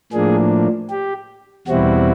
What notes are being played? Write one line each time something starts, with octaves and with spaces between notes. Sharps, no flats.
A2 F3 A#3 D4 G#4
G4
E2 B2 G3 C4 E4 F#4